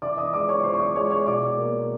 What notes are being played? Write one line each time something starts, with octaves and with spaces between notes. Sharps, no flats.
E3 D5 D6
D#5 D#6
G#3 D5 D6
C#5 C#6
E3 C5 C6
C#6
D5 D6
G#3 C#5 C#6
C#5 C#6
B2 D5 D6
A#3